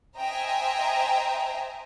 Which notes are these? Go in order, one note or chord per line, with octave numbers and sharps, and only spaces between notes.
C5 D#5 E5 G5 G#5 A#5